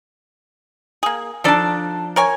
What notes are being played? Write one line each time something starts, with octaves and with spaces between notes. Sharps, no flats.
A#3 G#4
F3 D4 D#4 A4 D5 A5
A#4 C#5 G#5